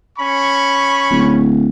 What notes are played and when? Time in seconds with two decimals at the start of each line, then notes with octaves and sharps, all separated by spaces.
0.18 C#4 B5 C#6
1.11 D1